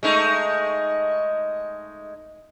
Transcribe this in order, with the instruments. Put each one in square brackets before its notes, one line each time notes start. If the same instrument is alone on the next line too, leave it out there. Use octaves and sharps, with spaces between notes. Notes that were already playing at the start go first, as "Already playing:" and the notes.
[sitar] G#3 A3 D#4